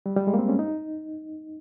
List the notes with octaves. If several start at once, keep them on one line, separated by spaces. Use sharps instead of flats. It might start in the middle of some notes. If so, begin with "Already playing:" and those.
G3
G3
G#3
A#3
C4
C#4
D#4